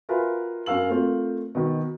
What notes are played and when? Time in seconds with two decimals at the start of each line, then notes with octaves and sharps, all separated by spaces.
0.09 F4 F#4 A#4 B4 E5 G#5
0.66 F#2 A#4 F5 E6 F#7
0.90 A3 C4 F4 A#4
1.55 B2 D#3